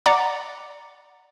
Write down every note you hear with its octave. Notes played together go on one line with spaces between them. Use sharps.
D5 F#5 A#5 D6